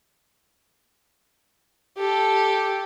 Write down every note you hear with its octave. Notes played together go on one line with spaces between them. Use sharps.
G4 A4